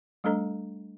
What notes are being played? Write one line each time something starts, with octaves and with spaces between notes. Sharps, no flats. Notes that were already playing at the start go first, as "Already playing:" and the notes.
G3 A3 D4 A4 D#5 A#5